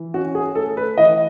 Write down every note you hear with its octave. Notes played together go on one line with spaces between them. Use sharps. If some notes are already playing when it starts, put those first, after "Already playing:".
Already playing: E3
C#4 F#4
G#4
A3 A4
B4
E3 D#5